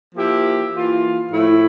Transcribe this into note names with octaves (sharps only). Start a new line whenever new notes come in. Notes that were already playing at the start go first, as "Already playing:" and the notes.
F3 A#3 E4 G4
E3 A#3 F4
A2 F3 A3 E4